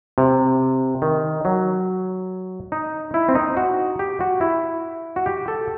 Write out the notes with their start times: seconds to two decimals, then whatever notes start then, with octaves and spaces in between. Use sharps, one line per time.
0.18 C3
1.02 D#3
1.45 F#3
2.72 D#4
3.14 E4
3.29 C4
3.35 D#4
3.57 F#4
3.99 G4
4.20 F#4
4.41 E4
5.16 F#4
5.26 G4
5.48 A4